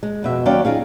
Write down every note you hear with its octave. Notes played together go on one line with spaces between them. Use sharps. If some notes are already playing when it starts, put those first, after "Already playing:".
G#3
F2 B2 E5
D#2 F#3 C#4 D5 F5 G5
D#4 F4 G#4 F5